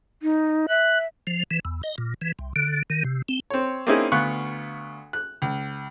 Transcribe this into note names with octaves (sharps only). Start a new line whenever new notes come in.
D#4
E5 F#6
F3
E3
E2
D#5
A#2
E3
C2
D3
D#3
C3
C4
C4 C#5
A#3 C4 C#4 D#4 E4 G#4
D2 B3 F5 C#6 F#6
F#6
C#2